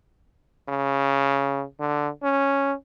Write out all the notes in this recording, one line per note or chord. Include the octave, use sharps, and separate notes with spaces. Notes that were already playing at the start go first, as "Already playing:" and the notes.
C#3
D3
C#4